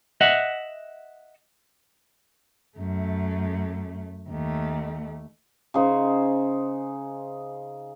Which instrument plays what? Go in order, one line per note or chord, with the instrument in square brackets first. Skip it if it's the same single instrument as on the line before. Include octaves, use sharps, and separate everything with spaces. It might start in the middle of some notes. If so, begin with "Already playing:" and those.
[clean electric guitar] D#5 E5 F#5
[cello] F#2 A3
D#2 A3
[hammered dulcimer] C#3 D#4 G#4 C5